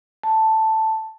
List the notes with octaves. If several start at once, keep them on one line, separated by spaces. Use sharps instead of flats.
A5